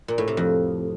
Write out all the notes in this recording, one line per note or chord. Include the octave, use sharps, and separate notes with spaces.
A#2
A2
C3
F2